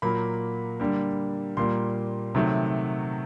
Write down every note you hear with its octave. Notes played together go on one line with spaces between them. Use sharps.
A#2 F#3 A#3 B5
D3 G3 A#3
A#2 G3 A#3 C6
C3 D#3 F#3 A3